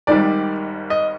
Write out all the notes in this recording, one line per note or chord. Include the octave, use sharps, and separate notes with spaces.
G#1 G#2 D#3 G3 D5
D#5